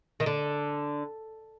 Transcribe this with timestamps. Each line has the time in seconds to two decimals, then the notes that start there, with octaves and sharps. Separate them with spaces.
0.20 D#3
0.26 D3